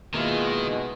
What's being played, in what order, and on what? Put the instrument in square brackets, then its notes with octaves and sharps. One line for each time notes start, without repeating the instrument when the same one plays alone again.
[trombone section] B2 G#3 [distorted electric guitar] D#3 [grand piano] A#3 E4 F4